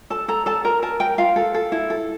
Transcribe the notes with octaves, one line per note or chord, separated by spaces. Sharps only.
A4 A5
A4 A#5
A4 A5
A#4 A#5
A#4 A5
A#4 G5
F4 F5
A4
A4
E4
A4